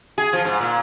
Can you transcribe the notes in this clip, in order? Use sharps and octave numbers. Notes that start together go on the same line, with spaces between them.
G#4
F3
G#2
A#2